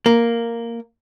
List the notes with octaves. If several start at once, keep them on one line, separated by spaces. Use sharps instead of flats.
A#3